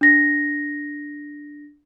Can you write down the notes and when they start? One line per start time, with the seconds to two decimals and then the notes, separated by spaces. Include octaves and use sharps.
0.01 D4 A#6